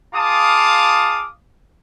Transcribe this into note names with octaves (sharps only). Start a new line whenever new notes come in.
F4 G#4 F5 A5 D6 D#6